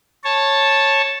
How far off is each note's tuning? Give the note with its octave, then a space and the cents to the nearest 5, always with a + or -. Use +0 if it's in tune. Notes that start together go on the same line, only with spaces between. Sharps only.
C#5 -10 A5 +0